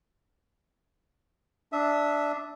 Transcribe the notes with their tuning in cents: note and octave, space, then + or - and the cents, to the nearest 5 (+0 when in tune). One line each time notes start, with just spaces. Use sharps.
D4 +0 E5 +0 D#6 +35